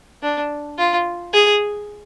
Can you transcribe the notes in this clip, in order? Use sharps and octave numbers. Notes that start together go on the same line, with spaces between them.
D4
F4
G#4